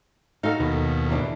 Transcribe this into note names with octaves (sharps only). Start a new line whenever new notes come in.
D#4 F#4 A4 F5
D#2 B2
E3 D4